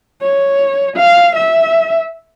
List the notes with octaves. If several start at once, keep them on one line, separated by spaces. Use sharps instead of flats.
C#5
F5
E5